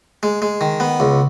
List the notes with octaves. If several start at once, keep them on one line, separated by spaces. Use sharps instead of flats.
G#3
G#3
D#3
B3
C#2